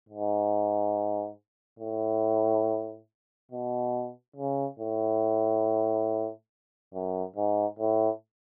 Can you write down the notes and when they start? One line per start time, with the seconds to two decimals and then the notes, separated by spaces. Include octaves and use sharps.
0.09 G#2
1.79 A2
3.51 B2
4.36 C#3
4.79 A2
6.94 F#2
7.36 G#2
7.79 A2